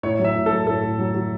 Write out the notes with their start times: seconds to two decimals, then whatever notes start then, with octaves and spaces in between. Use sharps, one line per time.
0.03 A2 C#5
0.19 F#3
0.24 E5
0.35 A2
0.46 A4
0.52 F#3
0.67 A2 A4
0.83 A2
0.99 F#3
1.15 F#3